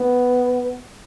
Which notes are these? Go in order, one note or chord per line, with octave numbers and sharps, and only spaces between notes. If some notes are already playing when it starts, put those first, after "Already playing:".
Already playing: B3